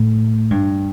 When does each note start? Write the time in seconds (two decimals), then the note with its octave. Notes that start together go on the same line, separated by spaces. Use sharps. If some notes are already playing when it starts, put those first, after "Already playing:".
Already playing: A2
0.51 G2